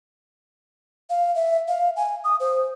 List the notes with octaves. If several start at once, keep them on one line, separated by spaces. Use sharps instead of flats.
F5
E5
F5
G#5
D#6
C5